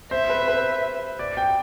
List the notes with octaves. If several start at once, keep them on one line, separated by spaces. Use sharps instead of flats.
C5 E5
B4
B4
D5
G5